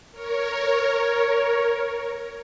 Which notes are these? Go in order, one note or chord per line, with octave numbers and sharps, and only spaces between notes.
A#4 C#5